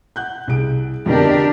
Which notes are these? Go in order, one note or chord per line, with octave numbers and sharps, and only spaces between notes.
F#5 F#6 G6
C2 G#4 D7
F2 B2 D3 D4 G4 A#4